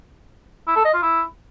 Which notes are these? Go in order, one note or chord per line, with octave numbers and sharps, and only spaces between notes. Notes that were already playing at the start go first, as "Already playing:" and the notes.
E4
A4
D#5
F4
E4